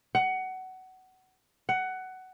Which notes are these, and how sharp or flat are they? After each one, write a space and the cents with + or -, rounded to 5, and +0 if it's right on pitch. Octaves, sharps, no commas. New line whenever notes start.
F#5 +20
F#5 +15